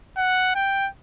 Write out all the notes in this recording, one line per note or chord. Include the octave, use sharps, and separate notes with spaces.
F#5
G5